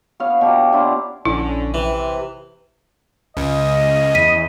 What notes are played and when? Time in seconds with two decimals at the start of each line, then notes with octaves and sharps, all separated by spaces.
0.20 B3 C#5 F5
0.41 B2 G4 A#5
0.72 D4 E4 F4
1.25 A#1 D3 C#4 E4
1.74 C3 E3
3.37 C#2 C#3 D#5
4.15 E2 B6 D#7